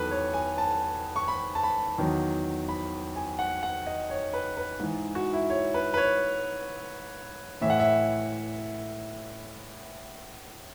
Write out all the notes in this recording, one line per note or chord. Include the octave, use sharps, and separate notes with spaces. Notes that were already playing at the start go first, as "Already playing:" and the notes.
Already playing: E2 D#3 F#3 A4 B4
C#5
G#5
A5
C#6
B5
A5
B5
E2 D#3 F#3
B5
G#5
F#5
F#5
D#5
C#5
B4
B4
G#2 E3
F#4
E4
C#5
B4
B4
C#5
A2 E3 E5
F#5
E5